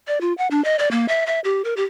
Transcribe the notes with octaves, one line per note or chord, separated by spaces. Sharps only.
D5
F4
F#5
D4
D#5
D5
A#3
E5
E5
G4
A#4
G4